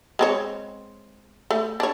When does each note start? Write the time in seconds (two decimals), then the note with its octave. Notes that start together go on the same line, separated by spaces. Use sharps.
0.19 G#3 C4 C#5
1.51 A3
1.80 D4 C#5